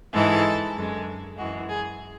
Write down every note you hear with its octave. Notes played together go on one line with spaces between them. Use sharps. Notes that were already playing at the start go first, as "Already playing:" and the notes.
G#2 E3 G#3 A4
F#2 D3 G#3
F#2 E3 G#3 F#4
G#4